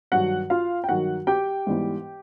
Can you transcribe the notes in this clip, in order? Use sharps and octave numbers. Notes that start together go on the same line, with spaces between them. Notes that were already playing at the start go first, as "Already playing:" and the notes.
G2 D#3 F#3 F#4 F#5
F4 F5
G5
G2 D#3 F#3 F#4 F#5
G4 G5
G#2 E3 G3 B3